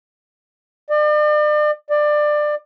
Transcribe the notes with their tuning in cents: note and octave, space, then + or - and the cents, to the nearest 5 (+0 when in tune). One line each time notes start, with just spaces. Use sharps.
D5 +40
D5 +20